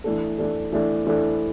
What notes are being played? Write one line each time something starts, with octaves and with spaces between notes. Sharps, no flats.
E3 A3 D4 A4
E3 A3 D4 A4
E3 A3 D4 A4
E3 A3 D4 A4